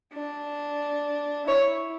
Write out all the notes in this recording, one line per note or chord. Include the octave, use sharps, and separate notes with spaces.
D4
E4 C#5